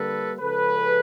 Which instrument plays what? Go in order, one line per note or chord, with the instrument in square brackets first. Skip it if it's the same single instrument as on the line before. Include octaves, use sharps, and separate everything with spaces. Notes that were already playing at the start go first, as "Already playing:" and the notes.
Already playing: [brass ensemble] D3 G3 A#3 A4 B4
C#3 F3 G#3 C#4 A4 B4